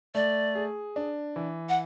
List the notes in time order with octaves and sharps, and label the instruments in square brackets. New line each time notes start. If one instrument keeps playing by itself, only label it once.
[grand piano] A3 [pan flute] D5
[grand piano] G#4
D4
E3
[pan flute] F#5